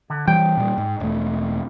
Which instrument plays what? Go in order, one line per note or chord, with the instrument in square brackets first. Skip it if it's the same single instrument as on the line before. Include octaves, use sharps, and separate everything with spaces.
[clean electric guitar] D3
[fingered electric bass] E3 G3 [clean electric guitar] G5
[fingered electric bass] A#2 G3
G#2
E1 A3